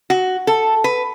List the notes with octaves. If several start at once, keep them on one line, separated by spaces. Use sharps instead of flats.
F#4
A4
B4